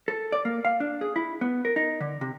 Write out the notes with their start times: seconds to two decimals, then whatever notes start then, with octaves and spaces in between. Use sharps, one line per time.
0.08 A4
0.32 D5
0.45 A#3
0.65 F5
0.80 D4
1.01 G#4
1.16 E4
1.41 B3
1.65 A#4
1.76 D#4
2.01 D3
2.21 C3